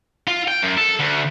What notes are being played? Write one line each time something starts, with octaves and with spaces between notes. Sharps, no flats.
F4
G5
F#2
A4
D2